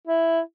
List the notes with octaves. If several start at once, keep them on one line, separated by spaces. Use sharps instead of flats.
E4